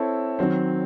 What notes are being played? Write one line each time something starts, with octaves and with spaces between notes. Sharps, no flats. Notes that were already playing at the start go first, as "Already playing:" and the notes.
Already playing: C4 E4 A4 C#5
D#3 F#3 C4